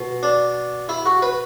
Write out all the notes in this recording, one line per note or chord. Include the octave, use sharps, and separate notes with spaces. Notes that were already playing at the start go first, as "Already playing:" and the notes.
Already playing: B2
D4
E4
F#4
B4